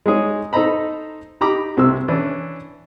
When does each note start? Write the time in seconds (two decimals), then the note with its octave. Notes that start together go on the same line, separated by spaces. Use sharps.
0.06 G#3 D#4 G#4 C#5
0.53 D#4 A4 C5 D#5 A#5 B5
1.41 D#4 G4 A#5 B5 D6
1.77 C2 C3 E6
2.08 E3 C#4 D4 E4